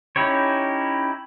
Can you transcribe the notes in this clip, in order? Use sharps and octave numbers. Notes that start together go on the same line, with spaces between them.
C#4 D#4 E4 G4 C#5